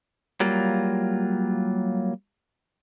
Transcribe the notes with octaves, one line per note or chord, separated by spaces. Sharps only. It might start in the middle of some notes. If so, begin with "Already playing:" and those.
F#3 G3 A#3 F4